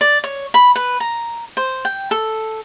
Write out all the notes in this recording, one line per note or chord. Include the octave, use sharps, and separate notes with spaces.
D5
C#5
B5
B4
A#5
C5
G5
A4